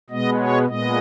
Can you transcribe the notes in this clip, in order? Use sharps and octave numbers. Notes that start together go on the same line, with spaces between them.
B2 G#3 B3 D#5
C#5
A#2 G#3 B3 D#5